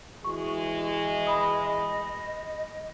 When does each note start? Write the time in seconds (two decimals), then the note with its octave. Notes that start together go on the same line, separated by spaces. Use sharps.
0.24 E3 G#3 F#4 C#6
1.27 D#5 B5 D#6